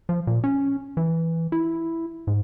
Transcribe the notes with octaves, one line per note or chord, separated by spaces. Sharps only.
F3
A#2
C#4
E3
E4
G#2